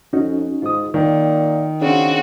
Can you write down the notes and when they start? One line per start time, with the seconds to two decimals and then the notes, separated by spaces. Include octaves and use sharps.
0.13 F2 C#4 D#4 F#4
0.62 G#2 F4 D#6
0.94 A#2 D#3 G5
1.81 C#3 C4 D4 F#4